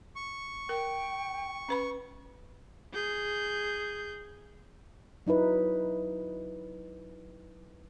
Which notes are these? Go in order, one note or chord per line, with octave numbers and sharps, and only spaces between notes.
C#6
A#4 G5
C#4 B4 B5
G#4 G6
F#3 D#4 E4 B4